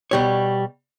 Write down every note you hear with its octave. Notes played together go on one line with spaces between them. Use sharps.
B2 G3 C#5